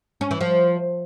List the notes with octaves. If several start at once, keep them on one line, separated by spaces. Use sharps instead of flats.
C#4
E3
F3